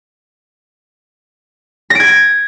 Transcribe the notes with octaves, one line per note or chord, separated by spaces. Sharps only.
G#6 A#6 D7